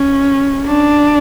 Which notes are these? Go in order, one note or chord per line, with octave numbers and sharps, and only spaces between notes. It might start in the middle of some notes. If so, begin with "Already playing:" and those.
Already playing: C#4
D4